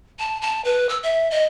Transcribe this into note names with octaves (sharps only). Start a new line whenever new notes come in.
A5
A5
B4
E6
E5
D#5